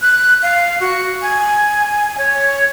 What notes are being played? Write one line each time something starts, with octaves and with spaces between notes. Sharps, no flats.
F#6
F5
F#4
G#5
C#5